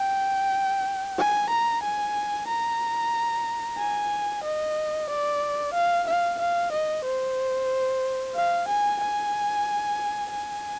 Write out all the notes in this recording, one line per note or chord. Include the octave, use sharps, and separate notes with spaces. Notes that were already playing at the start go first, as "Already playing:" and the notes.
Already playing: G5
G#5
A#5
G#5
A#5
G#5
D#5
D5
F5
F5
F5
D#5
C5
F5
G#5
G#5
G#5